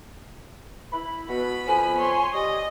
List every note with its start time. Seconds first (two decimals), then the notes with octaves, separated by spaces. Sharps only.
0.93 E4 B5
1.28 B2 B3 F#4 B5
1.67 F2 G#5
1.98 C#5 C6
2.33 G3 D#5